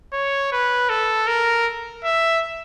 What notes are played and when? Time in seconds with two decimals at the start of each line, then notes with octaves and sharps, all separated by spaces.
0.13 C#5
0.52 B4
0.89 A4
1.28 A#4
2.04 E5